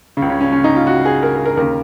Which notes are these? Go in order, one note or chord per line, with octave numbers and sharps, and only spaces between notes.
C#3
C#2
C#4
C#4
C#4
D#4
F4
F#4
G#4
A#4
G#4
A#4
D#2 C#3 A#4